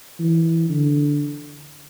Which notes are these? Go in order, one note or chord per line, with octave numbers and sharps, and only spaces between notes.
E3
D3